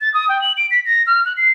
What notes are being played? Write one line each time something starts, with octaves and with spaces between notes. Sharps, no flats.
A6
D#6
G5
F#7
D7
B6
A#6
F6
F#6
C7